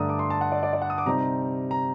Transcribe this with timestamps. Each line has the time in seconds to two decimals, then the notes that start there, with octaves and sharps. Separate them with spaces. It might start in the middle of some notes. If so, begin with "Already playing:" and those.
Already playing: G2 D3 A3 D4 A#5 D#6
0.09 D6
0.19 C6
0.30 A5
0.41 F#5
0.52 D5
0.63 D5
0.73 D5
0.82 F#5
0.90 D#6
0.98 D6
1.06 C3 G3 C4 D#4 A#5
1.71 A#5